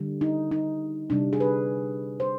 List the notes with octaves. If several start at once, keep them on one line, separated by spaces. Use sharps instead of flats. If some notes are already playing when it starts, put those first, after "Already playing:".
Already playing: D3 G3
D#4
D#4
C3 G3 D4
G#4
B4
C5